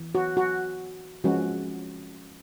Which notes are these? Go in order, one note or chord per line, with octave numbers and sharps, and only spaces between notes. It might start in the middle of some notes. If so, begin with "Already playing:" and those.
Already playing: E3
F#4
F#4
F3 G#3 C#4 F#4